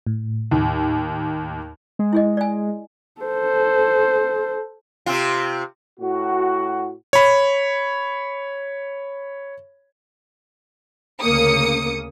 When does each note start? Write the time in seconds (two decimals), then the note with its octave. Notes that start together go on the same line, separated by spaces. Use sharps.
0.07 A2
0.51 D#2
1.99 G#3
2.13 E4 G#4 D#5
2.37 D5 G#5
3.21 A4 C5
5.06 C3 C4 F4
6.00 A2 F#4
7.13 C#5 B5
11.22 D2 C#3 A#3 D#6 C#7